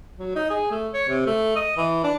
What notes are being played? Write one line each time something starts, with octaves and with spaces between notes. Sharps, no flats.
F#3
D#4
G#4
A3
C#5
C3
A3
D#5
E3
D4